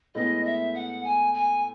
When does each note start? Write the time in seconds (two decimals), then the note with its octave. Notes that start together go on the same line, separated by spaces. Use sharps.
0.15 A2 G#3 B3 D#5
0.45 E5
0.74 F#5
1.04 G#5
1.34 G#5